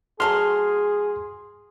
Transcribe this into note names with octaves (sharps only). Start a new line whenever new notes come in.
F#3 A3 F#4 G#4 C6 F6